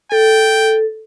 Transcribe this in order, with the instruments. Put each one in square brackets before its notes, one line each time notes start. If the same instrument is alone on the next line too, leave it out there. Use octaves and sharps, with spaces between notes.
[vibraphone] A4 [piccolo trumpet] G5